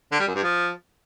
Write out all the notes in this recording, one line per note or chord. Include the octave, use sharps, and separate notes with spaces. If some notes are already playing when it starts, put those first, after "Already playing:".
D3
G3
F#2
G2
F3